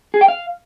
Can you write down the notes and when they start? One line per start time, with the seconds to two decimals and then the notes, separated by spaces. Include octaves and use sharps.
0.14 G#4
0.21 G5
0.28 F5